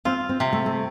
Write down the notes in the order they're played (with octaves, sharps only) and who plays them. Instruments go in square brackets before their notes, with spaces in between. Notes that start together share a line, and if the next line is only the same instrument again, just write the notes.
[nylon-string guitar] C4 [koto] F4
[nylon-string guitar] C4
[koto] C3
[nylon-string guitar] A3
A3